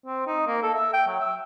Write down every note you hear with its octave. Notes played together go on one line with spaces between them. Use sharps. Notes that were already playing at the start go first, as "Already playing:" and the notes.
C4
D#4
A#3
A4
E5
G5
F#3
E5